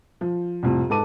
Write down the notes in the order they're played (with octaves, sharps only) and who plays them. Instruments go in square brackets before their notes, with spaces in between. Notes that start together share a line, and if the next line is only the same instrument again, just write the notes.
[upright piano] F3
C2 F2 A2
G#2 A4 B4 A5 D6 D#7